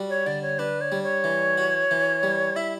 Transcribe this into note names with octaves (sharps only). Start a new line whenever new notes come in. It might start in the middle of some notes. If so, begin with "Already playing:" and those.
Already playing: G3 F#4
C#5
D3 D5
C#5
D4 B4
C#5
G3
C#5
E3
F#4
E3
G3
E4 E5